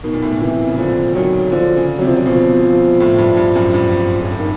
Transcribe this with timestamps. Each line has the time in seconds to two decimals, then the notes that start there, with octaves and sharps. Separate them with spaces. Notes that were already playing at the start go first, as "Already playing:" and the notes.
0.04 B2 D#3
0.13 A#2
0.22 A2
0.32 A#2
0.41 C3 E3
0.67 C#3 E3
0.78 D3 F3
1.14 D#3 F#3
1.52 D3 F3
1.77 C#3
1.98 C3 F#3
2.07 F3
2.16 F#3
2.26 B2 F3
2.63 F3
3.00 A2
3.18 G2
3.37 G2
3.55 F#2
3.74 G2
4.21 C#3
4.30 D3
4.39 D#3